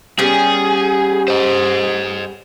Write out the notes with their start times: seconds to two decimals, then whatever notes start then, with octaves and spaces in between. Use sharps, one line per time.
0.19 G3 B3 C#4 G#4
1.28 C5 D#5